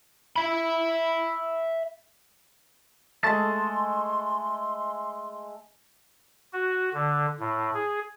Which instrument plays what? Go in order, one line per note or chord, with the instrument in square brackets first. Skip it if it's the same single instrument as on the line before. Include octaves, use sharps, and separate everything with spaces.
[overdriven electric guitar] E5 B5
[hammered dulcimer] G#3 A3 [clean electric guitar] A5 [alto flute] C6
[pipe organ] F#4
D3
A2
G#4